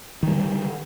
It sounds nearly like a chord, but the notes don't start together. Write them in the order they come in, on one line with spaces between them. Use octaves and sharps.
D#3 G3 D3